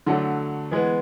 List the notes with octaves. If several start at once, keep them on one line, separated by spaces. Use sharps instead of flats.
D3 F#3 A3
E3 G#3 B3